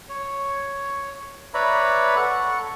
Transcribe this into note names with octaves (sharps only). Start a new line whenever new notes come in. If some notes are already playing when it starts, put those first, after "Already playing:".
C#5
B4 C#5 D5 E5 A#5 B5
A4 F#5 C#6